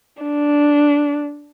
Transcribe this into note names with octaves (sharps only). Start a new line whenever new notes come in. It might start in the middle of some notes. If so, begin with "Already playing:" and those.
D4